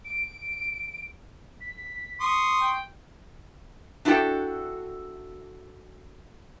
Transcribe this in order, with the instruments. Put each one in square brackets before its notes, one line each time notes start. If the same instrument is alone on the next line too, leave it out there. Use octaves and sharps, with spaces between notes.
[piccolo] D7
B6
[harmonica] C6 C#6 D#6
[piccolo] G5
[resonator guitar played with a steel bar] D4 E4 F#4 G#4 A4 G5